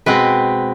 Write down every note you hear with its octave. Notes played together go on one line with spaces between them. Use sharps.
B2 G#3 C4 B4